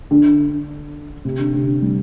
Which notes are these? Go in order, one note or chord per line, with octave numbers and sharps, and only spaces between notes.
D3
C3
D3
C3
D3
G3